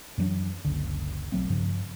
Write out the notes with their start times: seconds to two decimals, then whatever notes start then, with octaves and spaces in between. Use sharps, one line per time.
0.18 F#2 E3 F#3 D4
0.65 F#1 C#2 D3
1.32 B1 F#3 A3 C4
1.50 G2 C#3 F3